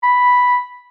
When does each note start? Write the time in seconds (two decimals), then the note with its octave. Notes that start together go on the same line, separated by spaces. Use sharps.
0.03 B5